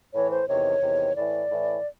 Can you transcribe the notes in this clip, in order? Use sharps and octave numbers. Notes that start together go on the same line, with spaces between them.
A2 E3 C#5
C5
E2 C3 D#3 C#5
E2 C3 D#3
A2 E3 D5
A2 E3